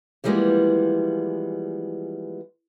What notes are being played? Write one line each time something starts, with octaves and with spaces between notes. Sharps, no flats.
E3 F3 G3 G#3 A#3 B3